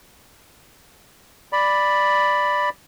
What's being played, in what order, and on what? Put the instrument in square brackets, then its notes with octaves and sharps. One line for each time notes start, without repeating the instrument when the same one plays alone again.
[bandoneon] D5 B5